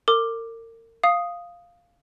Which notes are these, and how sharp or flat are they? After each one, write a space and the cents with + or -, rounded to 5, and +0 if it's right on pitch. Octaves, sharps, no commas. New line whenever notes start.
A#4 -35 D6 +10
F5 +0 D#6 +0